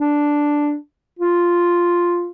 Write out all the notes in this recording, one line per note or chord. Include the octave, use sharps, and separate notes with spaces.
D4
F4